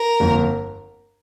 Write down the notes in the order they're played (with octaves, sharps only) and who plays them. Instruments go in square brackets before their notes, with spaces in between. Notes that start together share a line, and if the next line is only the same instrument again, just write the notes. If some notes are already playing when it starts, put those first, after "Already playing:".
Already playing: [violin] A#4
[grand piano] G1 F2 F3 A#3